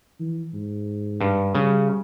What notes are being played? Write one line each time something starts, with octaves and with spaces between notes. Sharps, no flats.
E3
G#2
G2
C#3 G3